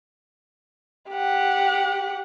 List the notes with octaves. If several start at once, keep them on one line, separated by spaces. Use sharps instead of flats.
G4 F#5